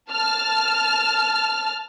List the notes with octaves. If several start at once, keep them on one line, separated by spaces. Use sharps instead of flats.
A5 F6